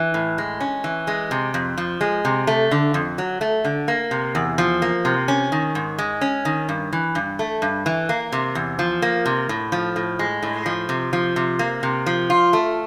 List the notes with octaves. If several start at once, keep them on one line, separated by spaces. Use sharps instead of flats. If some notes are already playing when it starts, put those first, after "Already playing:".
Already playing: E3
A2
G#3
C#4
E3
G#3
C3
F2
F3
G#3
C3
A3
D3
F2
F#3
A3
D3
A#3
C3
E2
F3
A#3
C3
C#4
D#3
G#2
G#3
C#4
D#3
G2
E3
G2
A3
G2
E3
A#3
C3
E2
F3
A#3
C3
A2
F3
A2
G#3
A2
F3
C3
F3
C3
A#3
C3
F3
F4
A3